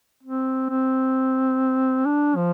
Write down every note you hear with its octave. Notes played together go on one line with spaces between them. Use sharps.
C4
C4
D4
F3